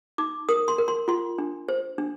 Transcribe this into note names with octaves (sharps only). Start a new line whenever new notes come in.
D#4 D6
A#4 D#6
C6
A#4
C6
F4 C6
D4
C5
D4